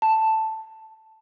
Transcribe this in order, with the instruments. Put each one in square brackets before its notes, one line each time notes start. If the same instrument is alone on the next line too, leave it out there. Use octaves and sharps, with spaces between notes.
[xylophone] A5